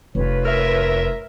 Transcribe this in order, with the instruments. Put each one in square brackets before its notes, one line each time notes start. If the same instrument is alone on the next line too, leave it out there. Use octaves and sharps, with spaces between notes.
[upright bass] F1 [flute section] F4 B4 C#5
[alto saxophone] A#4 [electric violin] E5